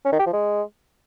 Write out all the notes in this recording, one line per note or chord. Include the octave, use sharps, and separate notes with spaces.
C#4
D#3
G4
F3
G#3